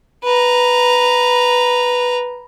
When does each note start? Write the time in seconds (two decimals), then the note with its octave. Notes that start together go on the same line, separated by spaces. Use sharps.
0.24 B4 A#5